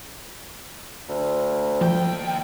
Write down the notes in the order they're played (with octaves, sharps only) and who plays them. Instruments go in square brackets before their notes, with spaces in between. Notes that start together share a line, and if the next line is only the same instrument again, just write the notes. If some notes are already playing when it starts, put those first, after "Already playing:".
[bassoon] D2
[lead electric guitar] D#2 G5 [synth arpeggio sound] F3